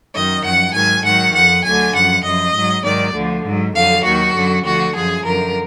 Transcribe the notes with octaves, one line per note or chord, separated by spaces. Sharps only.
F#2 D#3 F#3 D#5
F#2 F3 F#5
G#2 D#3 F#3 G#5
G#2 D#3 F#3 F#5
F2 F3 F#5
D2 D3 F#3 G#5
F#2 F3 F#5
F#2 F3 D#5
G#2 F#3
G#2 D#3 F#3 D5
D2 D3 F3
G#2 F#3
F2 D3 F#3 F5
D#2 D#3 F#3 F#4
F#2 D3 F#3
D2 D3 F3 F#4
F#2 F3 G#4
F#2 D3 F3 A#4